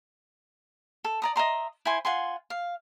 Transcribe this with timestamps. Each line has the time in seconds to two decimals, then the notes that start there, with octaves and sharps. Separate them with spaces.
1.04 A4
1.22 D5 A#5 D#6
1.36 D#5 E5 A#5 C6
1.85 E4 C5 G#5 C6
2.05 F4 F#5 G#5 C6
2.50 F5